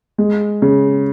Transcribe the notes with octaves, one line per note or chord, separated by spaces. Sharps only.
G#3
C#3